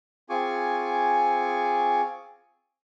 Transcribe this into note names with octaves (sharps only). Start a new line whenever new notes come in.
C4 F4 G#4 G#5 C#6 D6